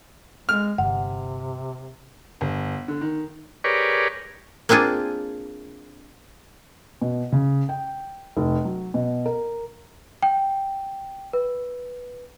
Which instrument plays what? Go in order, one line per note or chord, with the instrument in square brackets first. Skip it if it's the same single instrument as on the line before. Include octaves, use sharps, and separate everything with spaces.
[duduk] G#3 [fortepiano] F6
[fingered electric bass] G1 [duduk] C3 [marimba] F#5
[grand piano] G1
D3
D#3
[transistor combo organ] G4 G#4 A#4 B4 C#5 D5
[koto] A#3 C4 D4 F4 G#4
[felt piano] B2
C#3
G5
F1
F#3
B2
A#4
[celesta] G5
B4